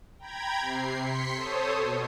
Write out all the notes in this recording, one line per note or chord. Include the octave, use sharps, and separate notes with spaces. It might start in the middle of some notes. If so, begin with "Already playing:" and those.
G5 A#5 B5 G#6
C3 C7
C6 B6 C#7
A4 C5 C#5 D#6
B2